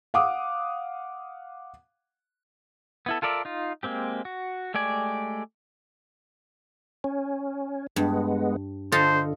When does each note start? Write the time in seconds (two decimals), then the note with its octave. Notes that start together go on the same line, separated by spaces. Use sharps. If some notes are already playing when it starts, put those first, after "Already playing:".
0.14 F5 F#5 D6 D#6
3.06 B3 E4 A4
3.22 F4 A4 A#4 D5 E5
3.45 D#4 F4
3.83 G#3 A#3 C4 G4
4.25 F#4
4.74 G#3 A3 G4 D5 G#5
7.04 C#4
7.96 G2 G#3 B3
8.92 D3 F4 A4 C5 D#5